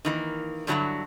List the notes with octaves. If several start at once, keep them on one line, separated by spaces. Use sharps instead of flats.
D#3 E3 A#3
G2 D3 F#3 B3 E4 F#4